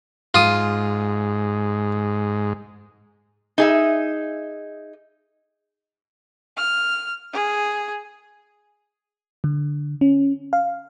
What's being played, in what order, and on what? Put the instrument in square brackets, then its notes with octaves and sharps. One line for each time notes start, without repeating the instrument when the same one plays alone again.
[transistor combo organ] G#2 [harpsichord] F4 D#6
[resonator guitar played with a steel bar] D#4 G#4 E5
[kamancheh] F6
G#4
[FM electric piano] D3
C#4
F5